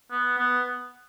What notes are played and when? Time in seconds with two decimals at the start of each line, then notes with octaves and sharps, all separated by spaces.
0.11 B3
0.38 B3